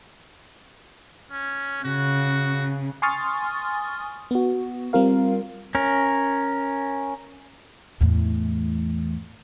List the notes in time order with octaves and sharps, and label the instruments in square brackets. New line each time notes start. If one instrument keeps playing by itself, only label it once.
[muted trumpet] C#4
[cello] C#3 [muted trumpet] F#4
[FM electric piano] G#5 C6 C#6 D#6 F6 A6
B3 F#4
G3 C4 F4 A#4 F5
[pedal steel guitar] C#4 A#4
[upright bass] E2 A2